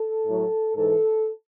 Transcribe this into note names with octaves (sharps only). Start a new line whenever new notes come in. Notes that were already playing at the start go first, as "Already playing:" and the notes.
Already playing: A4
A2 F#3
G#2 E3 A4